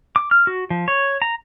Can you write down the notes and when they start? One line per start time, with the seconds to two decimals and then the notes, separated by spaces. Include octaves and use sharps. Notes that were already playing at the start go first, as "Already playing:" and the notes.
0.16 D6
0.31 F6
0.47 F#4
0.70 F3
0.88 C#5
1.22 A#5